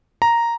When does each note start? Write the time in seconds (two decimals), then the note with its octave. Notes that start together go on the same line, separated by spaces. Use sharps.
0.22 A#5